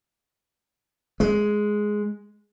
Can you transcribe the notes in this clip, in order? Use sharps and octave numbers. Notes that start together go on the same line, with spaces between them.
G#3